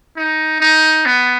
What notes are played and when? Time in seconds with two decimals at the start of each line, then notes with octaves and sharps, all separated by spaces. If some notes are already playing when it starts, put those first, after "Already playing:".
0.17 D#4
0.60 D#4
1.06 B3